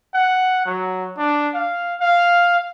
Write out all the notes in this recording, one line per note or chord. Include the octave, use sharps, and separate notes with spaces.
F#5
F#3
D4
F5
F5